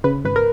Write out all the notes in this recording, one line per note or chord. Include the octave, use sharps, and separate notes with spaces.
C#3 B4
G#1 B4
A#4